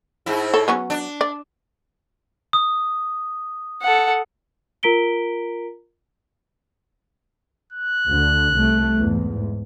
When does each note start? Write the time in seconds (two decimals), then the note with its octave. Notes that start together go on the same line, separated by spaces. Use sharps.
0.26 G#2 E4
0.54 A4 C#5
0.68 F#3 B3 C#4
0.90 D4
1.21 D5
2.53 D#6
3.82 A4 F#5
4.83 F4 A#4 A#5 B6 D7 G7
7.72 F#6
8.09 D2 D3
8.55 C2 A3
8.96 E2 G#2